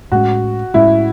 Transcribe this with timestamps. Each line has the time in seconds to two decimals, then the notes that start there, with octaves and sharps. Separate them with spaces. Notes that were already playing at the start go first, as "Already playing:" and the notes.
0.12 A2 G#3 C#4 F#4
0.74 A2 G#3 C#4 E4